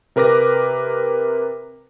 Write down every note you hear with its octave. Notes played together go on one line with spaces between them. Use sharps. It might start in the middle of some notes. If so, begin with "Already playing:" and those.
C3 A#4 B4 D6 A#6